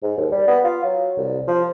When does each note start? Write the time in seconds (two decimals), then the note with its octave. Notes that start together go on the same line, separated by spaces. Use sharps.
0.03 G#2
0.17 D#2
0.32 G3
0.48 B3
0.64 F4
0.84 F#3
1.18 C2
1.47 F3